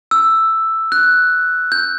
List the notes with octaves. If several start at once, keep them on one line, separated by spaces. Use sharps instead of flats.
E6
F#6
G6